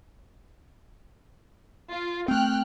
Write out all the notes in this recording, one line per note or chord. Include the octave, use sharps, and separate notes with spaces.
F4
A3 C4 G5 F6 F#6